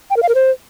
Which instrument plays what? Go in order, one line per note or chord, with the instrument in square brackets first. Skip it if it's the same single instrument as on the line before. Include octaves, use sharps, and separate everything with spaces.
[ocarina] G5
A#4
F5
A#4
C5